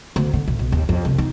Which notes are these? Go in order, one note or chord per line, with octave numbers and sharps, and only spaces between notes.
D2
D3
B1
B1
D#2
F2
C2
D#4